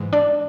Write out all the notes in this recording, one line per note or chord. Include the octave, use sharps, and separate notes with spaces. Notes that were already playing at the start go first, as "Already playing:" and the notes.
Already playing: G#2 E3 G#3
D4 D5